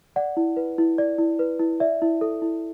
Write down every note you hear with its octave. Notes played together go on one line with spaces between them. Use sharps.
D5 F#5
E4
B4
E4
D5
E4
B4
E4
D5 E5
E4
A4
E4